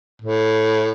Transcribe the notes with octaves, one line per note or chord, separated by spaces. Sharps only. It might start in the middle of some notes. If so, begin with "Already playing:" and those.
A2